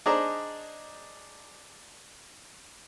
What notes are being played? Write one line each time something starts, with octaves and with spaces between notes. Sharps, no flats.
D4 D#4 G#4 C5 D5 A#5